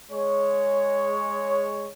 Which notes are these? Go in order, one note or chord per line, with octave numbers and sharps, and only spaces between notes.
G#3 C#5